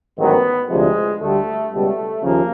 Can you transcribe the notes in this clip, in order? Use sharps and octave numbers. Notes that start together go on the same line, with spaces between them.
A1 G#2 D#3 F#3 B3
D2 C3 F3 G#3
D2 D3 G3 A3
C#2 B2 G3 A3
D#2 C#3 F3 A#3